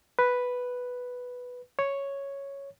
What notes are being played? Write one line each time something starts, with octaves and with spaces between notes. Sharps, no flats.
B4
C#5